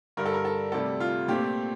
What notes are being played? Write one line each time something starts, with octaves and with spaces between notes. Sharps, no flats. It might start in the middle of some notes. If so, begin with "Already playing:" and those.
G2 D3 G3 A#4
A4
A#4
A4
D2 C3 G3 A4
F4
A#2 A3 C4 G4